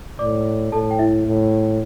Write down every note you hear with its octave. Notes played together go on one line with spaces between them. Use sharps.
A2 D5 D6
A2 A4 A5
G5
E4 E5
A2